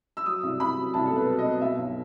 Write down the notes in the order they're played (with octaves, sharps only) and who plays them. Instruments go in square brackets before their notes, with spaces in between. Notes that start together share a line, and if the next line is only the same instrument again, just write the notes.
[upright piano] E6
F#3 D#6
C2
C2 B5
F#3
C2 A5
B2 A4
B4
F#3
D#5
B2
B2 E5
B1